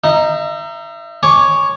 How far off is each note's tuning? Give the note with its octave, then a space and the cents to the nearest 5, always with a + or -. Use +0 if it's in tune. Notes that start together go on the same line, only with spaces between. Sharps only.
D#4 -5 E5 +35
C#5 +0 G#5 +0 D6 -10